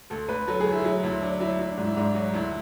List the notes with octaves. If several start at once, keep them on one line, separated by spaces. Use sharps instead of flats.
D2 A4
D2 B4
F#3 A4
G#4
D2
E4
F#3 E4
D2 E4
F#3 D4
F#3 E4
F#3 E4
D4
G#2
E4
G#2 D4
F#3 F#4
D2 E4